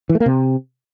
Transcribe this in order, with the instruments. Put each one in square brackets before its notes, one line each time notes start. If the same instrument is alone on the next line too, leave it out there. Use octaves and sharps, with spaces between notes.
[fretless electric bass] E3
A3
A#3
C3